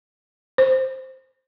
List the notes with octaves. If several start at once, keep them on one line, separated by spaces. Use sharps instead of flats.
C5